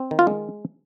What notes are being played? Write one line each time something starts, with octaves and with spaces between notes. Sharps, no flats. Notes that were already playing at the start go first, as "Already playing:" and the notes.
Already playing: C4
D#3
F4
G#3